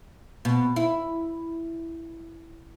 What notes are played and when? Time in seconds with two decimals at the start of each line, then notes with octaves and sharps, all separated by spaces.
0.45 B2
0.76 E4